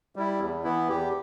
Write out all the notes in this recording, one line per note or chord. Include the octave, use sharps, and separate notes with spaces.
G3 E4
E2
E3 B3 E4
E2 G4